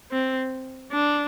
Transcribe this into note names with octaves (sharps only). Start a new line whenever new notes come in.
C4
D4